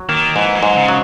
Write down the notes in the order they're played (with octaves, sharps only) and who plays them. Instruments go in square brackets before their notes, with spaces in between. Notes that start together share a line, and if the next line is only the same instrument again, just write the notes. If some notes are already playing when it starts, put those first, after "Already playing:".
Already playing: [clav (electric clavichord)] F#3
[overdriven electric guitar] D#3 [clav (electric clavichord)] A#3
[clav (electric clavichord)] G#2 [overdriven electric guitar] E3
[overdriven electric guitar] F#3
[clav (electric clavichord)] G#2
[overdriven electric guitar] C#3
[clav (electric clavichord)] F#3